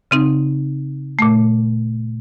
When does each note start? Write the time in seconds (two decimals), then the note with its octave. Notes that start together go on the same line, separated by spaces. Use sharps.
0.11 C#3 C4 D#4
1.19 A#2 A3